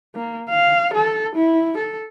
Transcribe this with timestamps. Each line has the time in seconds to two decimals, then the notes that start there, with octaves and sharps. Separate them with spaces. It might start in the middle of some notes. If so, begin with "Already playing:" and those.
0.15 A#3
0.49 F5
0.94 A4
1.36 E4
1.78 A4